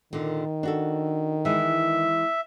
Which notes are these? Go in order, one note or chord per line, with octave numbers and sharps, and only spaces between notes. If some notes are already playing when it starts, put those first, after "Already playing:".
A#2 D3 D#3
D4 F#4 A4
E3 G#3 E5